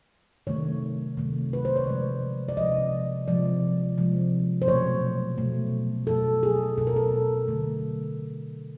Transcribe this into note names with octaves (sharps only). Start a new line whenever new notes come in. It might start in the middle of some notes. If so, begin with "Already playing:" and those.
C3 D#3 F#3 A3 C#5
C3 D#3 F#3 A3
B4
C5
C#5
C3 F3 G#3 D5
D5
C3 F3 G#3 D#5
C3 F3 G#3 D5
C3 F3 G#3
C5
B2 F#3 A3 C#5
B2 F#3 A3
B2 F#3 A3 A4
G#4
B2 F#3 A3 A4
A#4
A4
D3 F#3 A3